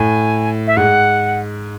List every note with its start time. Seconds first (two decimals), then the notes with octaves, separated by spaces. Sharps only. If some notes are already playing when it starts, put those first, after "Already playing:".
Already playing: A2 G#5
0.67 E5
0.77 G#2 F#5